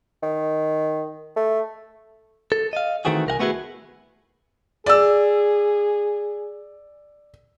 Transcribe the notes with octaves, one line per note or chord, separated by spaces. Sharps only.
D#3
A3
A4
D#5 F5
D#3 E3 A3 C4 F#4 G#4
C2 A#4 F#5 G#5
A3 B3 E4 F#4 G#4
G#4 D5 E6